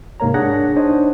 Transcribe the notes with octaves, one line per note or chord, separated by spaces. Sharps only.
G#2 C3 A#3 A#4 C#5 A#5
D4 G#4 C#5 F#5 F#6 A#6
D4 D#4 C5 C#5 D#5